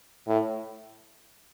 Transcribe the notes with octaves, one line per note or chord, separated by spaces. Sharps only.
A2